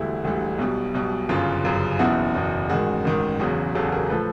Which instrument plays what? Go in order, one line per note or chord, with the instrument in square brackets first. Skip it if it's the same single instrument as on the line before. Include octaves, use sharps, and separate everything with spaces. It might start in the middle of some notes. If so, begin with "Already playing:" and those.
Already playing: [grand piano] E1 D2 D3 G3 E4
E1 D2 D3 G3
B1 B2 G3
B1 B2 G3
G1 F#2 C#3 F4
G1 F#2 C#3
F#1 E2 B2 E4 F#4
F#1 E2 B2
A1 G#2 D#3 F#4 G#4
A1 G#2 D#3
E1 E2 C#3 F#3 F#4 G#4
E1 E2 C#3 F#3 G4 A4
G#4 A#4
A2 F3 A4 B4